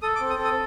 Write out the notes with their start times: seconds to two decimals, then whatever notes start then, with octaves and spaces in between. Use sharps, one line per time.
0.02 A4 D#6
0.16 D6
0.21 C4
0.30 D#6
0.39 A4
0.45 D#6